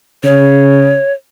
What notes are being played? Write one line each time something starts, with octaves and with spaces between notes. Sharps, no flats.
C#3 C#5